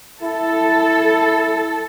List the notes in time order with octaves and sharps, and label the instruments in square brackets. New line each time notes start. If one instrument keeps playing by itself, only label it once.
[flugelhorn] E4 [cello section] A4